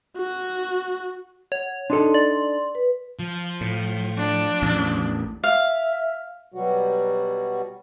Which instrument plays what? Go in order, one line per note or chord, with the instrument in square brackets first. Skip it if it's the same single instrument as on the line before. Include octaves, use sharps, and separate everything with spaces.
[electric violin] F#4
[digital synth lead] C#5 [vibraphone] F#5
[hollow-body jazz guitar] D4 D#4 A4 [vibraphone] C6
[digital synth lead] D5
[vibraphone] B4
[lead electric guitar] F3
[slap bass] A2
[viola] D4
[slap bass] A1 E2
[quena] E5 [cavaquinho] F5
[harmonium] B2 F#3 G3 F#4